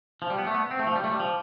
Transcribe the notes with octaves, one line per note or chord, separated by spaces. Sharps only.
F3
G3
B3
A3
B3
C4
A3
F3
G3
A3
G3
F3